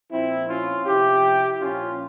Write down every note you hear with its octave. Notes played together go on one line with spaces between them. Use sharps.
A#2 F3 C4 E4
C#4 F4
C3 F3 E4 G4
A#2 F3 C#4 F4